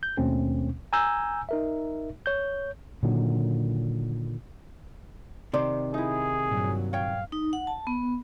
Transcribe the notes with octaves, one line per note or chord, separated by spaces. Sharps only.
G6
D#2 B2 A3 C4 C#4
G#5 A#5 E6 G6
D#4 A#4 E5
C#5 G6
A#2 D3 D#3 F#3
C3 D#3 C5 D5
D#4 E4 G#4
G2 A#2 F#3
C#5 F5 G5
D#4
F#5
A5
B3